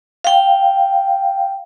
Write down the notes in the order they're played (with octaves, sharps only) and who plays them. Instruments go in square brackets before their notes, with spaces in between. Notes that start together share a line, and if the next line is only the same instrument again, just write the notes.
[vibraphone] F5 G5